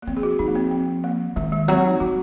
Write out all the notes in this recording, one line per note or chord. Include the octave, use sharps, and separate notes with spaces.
A#3
F3 C4
G#4
F#4
F3 D#4
A#3
C4
C4
A#3
D#3 G#3
G#3
F#3 C4
D#4
F#3 F#4